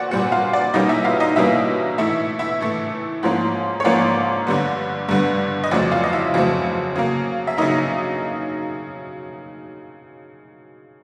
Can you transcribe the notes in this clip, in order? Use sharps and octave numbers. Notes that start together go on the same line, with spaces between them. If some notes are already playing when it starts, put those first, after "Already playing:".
Already playing: A#2 C4 F#4 C#5 D5 F#5
A#2 G3 C4 F#4 F#5
F4 F5
D5
B2 G3 A#3 C#4 D#4 D#5
E4 E5
F4 F5
D#4 D#5
B2 G3 A#3 C#4 E4 E5
A2 E3 A3 E4 E5
E4 E5
A2 E3 A3
G#2 F3 A#3 C#4
C#5
G#2 F3 A#3 C#4 D5
G2 D3 G3 B3
G2 D3 G3 B3
D#5
F2 C#3 F#3 A3 C4 D5
F4 F5
D#5
E4 E5
F2 C#3 F#3 A3 C4
C#3 F#3 A#3
E5
C#3 F#3 A#3 D#4 D#5